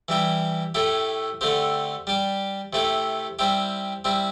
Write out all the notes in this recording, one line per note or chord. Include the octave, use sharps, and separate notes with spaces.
E3 G3 E4 G4
A2 A3 E4 G4
D3 A3 C4 G4
G3 D4 G4
C3 A3 E4 G4
G3 C4 E4 G4
G3 C4 E4